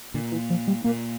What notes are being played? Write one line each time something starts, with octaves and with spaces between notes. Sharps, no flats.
A#2 D3
E3
F3
G3
A#2 A#3